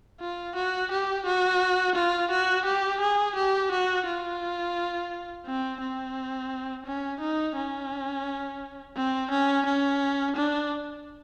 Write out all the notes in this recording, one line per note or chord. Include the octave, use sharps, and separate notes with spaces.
F4
F#4
G4
F#4
F4
F#4
G4
G#4
G4
F#4
F4
C4
C4
C#4
D#4
C#4
C4
C#4
C#4
D4